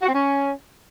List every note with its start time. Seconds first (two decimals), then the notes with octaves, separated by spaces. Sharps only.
0.02 F#4
0.08 C4
0.14 C#4